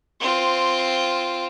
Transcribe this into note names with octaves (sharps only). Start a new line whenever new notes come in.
C4 F4